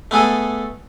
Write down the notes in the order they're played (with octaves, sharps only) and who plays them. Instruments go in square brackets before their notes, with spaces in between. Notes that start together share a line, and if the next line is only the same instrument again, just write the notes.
[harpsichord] A3 B3 G#4 A4